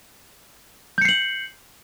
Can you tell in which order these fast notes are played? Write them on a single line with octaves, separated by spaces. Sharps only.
G6 C#7 C7 F#7